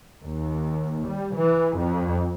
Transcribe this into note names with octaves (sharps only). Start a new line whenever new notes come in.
D#2
G3
E3
F2